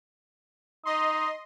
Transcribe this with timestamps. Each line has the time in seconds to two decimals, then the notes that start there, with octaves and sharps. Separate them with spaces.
0.85 D#4 D#5 C6